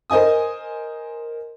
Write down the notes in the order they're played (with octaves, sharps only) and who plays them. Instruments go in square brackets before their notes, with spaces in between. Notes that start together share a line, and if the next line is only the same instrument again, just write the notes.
[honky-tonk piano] A#4 C5 D#5 G#5 D#6